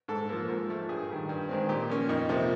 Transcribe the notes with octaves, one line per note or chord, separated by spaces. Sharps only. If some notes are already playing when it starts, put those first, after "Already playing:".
G#2 A4
F3 A#3
G#2
F3 A3
G2 G#4
D#3 G3
G2
D#3 G#3 C4
A#2 G4
F3 A#3 C#4
F2 D#4
C3 F3 A#3